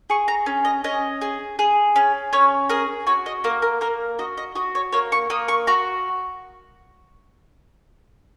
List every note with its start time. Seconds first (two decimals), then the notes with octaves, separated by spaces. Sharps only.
0.10 G#4 C#6
0.28 A#5
0.46 C#4
0.65 D#5
0.84 C#4 D#5
1.21 G#4
1.59 G#4
1.96 C#4
2.33 C#4 C#5
2.69 G#4 A#4
3.07 F#4 C#5
3.26 D#5
3.44 A#3 A#4
3.62 A#4
3.81 A#3 A#4
4.19 F#4 D#5
4.37 D#5
4.55 F#4 D#5
4.75 C#5
4.92 A#3 C#5
5.12 C#6
5.30 A#3 D#6
5.48 C#6
5.67 F#4 A#5